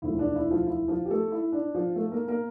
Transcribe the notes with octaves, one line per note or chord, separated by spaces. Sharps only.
E1 D2 D3 F3 A3 E4
D4
E4
F3 F4
E4
F3 F4
G4
A3 A4
E4
D4
F3 F4
A3 A4
A#3 A#4
A#3 A#4